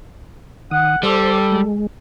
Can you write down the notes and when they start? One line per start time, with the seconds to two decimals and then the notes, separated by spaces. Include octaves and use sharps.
0.71 D#3 F#5 D#6
1.03 G3 A4 C5 C6 D6
1.52 G#3